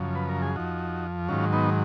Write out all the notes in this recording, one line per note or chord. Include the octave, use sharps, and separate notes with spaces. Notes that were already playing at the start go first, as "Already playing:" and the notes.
Already playing: F#2 C#3 F3
B4
A#4
G#4
F2 F3 D#4 F#4
G#2 D#3 F#3 C#4 F4
B3 D#4